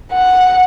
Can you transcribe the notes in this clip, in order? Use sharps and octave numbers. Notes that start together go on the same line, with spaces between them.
F#5